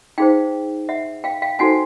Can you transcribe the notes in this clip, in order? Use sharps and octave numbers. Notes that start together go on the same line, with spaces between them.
D#4 G#4 C5 F5 G5
E5 F#5
F5 G5
F5 G5
D#4 F#4 A4 C5 F#5 G#5